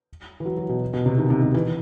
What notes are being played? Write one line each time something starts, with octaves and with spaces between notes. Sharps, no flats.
E3
F#3
F#3
B2
B2
C3
D#3
C3
C3
E3